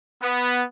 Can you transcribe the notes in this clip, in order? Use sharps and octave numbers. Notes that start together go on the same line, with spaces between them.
B3